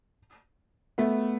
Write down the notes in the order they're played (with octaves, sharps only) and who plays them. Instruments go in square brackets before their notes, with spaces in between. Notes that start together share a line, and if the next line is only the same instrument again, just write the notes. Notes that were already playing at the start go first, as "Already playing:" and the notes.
[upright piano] A3 B3